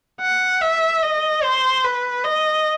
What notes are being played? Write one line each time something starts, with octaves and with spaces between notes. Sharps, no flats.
F#5
E5
D#5
C5
B4
D#5